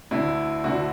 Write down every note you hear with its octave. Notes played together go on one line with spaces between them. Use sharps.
D2 D3 E4
D2 D3 F#4